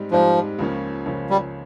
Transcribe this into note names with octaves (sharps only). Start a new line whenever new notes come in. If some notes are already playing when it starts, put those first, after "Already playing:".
Already playing: G#2 G3 C4 D#4 G4
G#2 F3 G3 C4 D#4 G4
C#2 C#3 F3 A#3 C#4
C#2 C#3 F3 A#3 C#4
G3